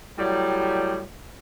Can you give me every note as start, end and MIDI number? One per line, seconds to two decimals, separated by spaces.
0.19 1.03 45
0.19 1.03 54
0.19 1.03 55